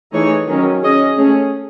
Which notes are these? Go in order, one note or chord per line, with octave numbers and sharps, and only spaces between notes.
E3 A3 D#4 G#4 C#5
D#3 F#3 C#4
C#4 G#4 D#5
A3 C#4 G#4